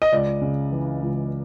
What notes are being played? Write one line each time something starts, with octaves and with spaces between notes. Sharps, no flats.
D#5
C#2 D5
C#3
E3
C#2